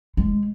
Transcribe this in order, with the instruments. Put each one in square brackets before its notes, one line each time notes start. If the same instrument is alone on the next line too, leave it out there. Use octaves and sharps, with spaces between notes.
[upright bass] G#3